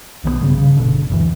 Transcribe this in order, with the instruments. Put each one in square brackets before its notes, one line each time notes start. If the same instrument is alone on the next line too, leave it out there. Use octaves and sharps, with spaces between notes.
[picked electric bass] B1 D#3 G3 B3
G2 C#3
C#3
G1 C2 B2 D3
F#1 D2 A2 E3